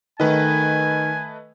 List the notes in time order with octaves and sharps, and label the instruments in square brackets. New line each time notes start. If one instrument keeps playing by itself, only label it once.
[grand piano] D#3 [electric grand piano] A3 B4 D#5 [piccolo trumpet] G#5